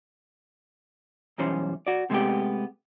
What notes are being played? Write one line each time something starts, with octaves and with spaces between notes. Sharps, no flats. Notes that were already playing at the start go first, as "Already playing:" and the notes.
B1 F#2 E3 G3 C#4 C5
F#4 D5
C3 G#3 A3 B3 G4